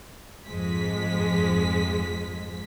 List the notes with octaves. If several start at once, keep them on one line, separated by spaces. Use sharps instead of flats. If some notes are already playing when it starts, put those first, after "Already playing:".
F2 G#2 F3 G#3 B6